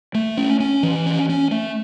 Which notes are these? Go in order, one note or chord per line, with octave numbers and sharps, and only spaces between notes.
A3
C#4
C#4
E3
C#4
C#4
A3